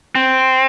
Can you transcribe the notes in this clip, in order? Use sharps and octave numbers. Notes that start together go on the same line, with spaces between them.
C4